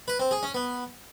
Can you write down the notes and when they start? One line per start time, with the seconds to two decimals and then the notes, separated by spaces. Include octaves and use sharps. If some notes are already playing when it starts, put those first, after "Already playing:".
0.08 B4
0.19 C4
0.31 G#4
0.43 C#4
0.54 B3